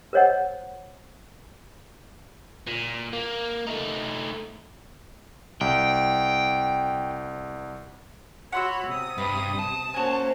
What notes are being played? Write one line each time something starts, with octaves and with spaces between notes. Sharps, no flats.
A#4 C5 C#5 D#5 F#5
A#2
A#3
A3 D#4
C2 G5
F#4 C#5 F#5 B5 C6 E6
C3 D#6
G2 B4
A5
A#3 C#4 F#4 C5 G#5